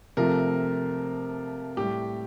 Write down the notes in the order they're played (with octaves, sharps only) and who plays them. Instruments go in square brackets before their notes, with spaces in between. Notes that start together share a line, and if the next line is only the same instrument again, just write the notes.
[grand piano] C3 F3 A3 A#4
A2 G3 G4